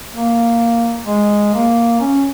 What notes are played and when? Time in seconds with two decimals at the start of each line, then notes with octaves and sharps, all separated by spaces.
0.11 A#3
1.06 G#3
1.54 A#3
2.00 C#4